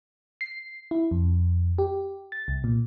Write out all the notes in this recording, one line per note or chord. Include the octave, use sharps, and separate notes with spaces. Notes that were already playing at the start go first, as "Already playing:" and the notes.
C7
E4
F2
G4
A6
C2
A#2